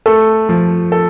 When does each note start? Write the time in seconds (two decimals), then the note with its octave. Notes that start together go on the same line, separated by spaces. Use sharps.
0.06 A3 A4
0.49 F3
0.92 A4